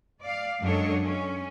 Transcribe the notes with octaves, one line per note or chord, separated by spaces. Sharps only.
D5 F5
F#2 G#3 D4 A4 C#5 D#5
C#4